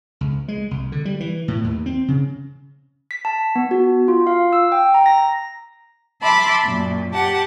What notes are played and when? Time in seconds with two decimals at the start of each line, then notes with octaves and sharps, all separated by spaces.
0.21 C#2
0.48 G#3
0.71 C2
0.92 D3
1.05 G3
1.20 E3
1.48 A2
1.64 D#2
1.86 C4
2.08 C#3
3.11 B6
3.25 A5
3.56 B3
3.71 F#4
4.08 F4
4.27 F5
4.53 E6
4.72 G5
4.94 A#5
5.06 A#6
6.22 E5 A5 B5 C6 D6
6.64 F#2 A#2
7.13 G4 F#5 A5